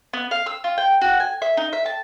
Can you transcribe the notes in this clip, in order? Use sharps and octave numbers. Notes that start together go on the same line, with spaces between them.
B3
F5
E6
F4
G5
F#4
G#5
E5
D#4
E5
A5